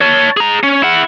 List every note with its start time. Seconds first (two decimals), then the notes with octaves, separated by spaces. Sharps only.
0.01 C#5 A5
0.37 G#4 A#5
0.63 C#4
0.82 E4 F#5